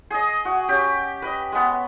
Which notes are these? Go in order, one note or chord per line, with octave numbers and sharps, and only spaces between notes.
G#4 D#5
F#4
C#4 G4
B4 D#5
G#3 B3